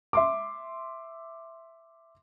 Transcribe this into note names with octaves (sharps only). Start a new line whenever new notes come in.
E5 C6 D6